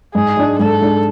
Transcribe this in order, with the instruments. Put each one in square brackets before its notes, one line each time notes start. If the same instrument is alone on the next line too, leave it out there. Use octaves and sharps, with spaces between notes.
[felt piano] G#2 [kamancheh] G#4
[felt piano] G#3 D4
[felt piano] G#2 [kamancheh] A4
[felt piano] G#3 D4